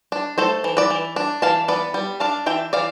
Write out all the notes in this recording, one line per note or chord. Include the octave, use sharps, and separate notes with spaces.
D4
A3 A4 C5
E3
B4 D5
E3
D4
E3 F5 A5
B3 B4 D5
G3
D4 F5 A5
E3 E5 G5
E3 D5 F5